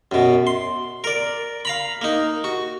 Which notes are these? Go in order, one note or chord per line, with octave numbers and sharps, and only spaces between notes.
F#2 B2
C6
A#4 D5
F5 A#5 B5
A#3 D#4
F#4